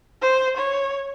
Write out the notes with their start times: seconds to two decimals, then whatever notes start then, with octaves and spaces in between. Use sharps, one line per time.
0.22 C5
0.57 C#5